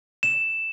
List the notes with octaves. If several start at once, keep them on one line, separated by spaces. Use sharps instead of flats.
E7